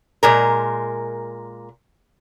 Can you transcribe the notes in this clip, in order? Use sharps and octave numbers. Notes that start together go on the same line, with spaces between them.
A#2 G#3 A#4